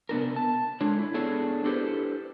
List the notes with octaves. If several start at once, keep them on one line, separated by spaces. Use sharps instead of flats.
C3 B3 D4 A#4
A5
G#3 D4 A4 C#5
E4
B3 D4 G#4 A4 C#5
D4 E4 G4 A4 B4 C5